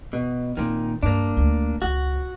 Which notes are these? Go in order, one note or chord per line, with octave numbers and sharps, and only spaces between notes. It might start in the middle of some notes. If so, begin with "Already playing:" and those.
B2
A#2 D#3 C4
G2 A#3 D4
D2
C#2 F#4